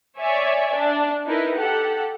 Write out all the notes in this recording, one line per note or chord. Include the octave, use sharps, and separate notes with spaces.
C#5 D5 E5 G#5
D4
D#4 E4 A#4 B4
G4 A4 F#5